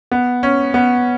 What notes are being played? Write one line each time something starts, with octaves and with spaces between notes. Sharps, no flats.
B3
C#4
B3